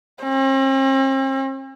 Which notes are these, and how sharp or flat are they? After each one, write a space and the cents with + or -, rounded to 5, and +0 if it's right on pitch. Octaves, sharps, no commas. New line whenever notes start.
C4 +45